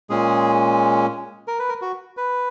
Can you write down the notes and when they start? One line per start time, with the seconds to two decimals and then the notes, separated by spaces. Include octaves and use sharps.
0.10 A#2 G#3 C#4 G#4
1.48 A#4
1.59 B4
1.69 A#4
1.82 F#4
2.17 B4